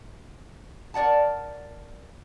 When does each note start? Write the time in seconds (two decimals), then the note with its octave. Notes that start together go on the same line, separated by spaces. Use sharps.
0.94 A#4 D5 F#5 A5